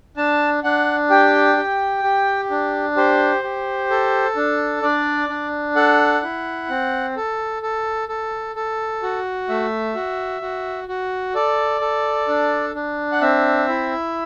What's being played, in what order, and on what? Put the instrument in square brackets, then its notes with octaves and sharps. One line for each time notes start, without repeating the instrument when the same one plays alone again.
[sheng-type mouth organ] D4 A5
D4 F#5
G4 G5
G4
G4
D4
G4 C5
G4
A4
D4
D4 D5
D4
A4 F#5
E4
C4
A4
A4
A4
A4
F#4
A3 E5
F#4
F#4
F#4
A4 D5
A4
D4
D4
F#5
C4 E5
E4